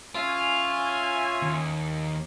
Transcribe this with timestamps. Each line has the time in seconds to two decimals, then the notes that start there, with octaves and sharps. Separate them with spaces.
0.15 C#4 F4 E5 G#5
1.42 D#2